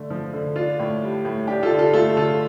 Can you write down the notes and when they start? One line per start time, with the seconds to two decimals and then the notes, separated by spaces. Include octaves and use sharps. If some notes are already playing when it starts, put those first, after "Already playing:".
Already playing: D3 A3
0.10 F3
0.33 D3
0.56 D4 F4
0.79 A2
1.03 G3
1.25 A2
1.47 D4 G4
1.63 F4 A4
1.71 D3
1.78 F4 A4
1.93 A3 F4 A4
2.17 D3 F4 A4